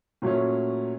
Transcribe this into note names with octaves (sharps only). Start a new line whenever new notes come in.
A#2 F#3 A3 C#4